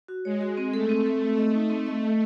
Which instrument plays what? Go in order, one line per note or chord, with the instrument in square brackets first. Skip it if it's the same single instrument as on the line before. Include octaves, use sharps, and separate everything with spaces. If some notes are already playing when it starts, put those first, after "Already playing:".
[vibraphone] F#4
[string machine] G#3 [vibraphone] C#5
[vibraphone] F#4
C4
[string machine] A3 [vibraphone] A4
[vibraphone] C4
A4
[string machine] A3 [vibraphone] C4
[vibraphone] D#5
D#4
C4
D#5
D#5